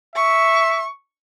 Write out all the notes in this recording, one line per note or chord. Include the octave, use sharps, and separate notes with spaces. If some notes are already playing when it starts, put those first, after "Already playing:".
E5 C#6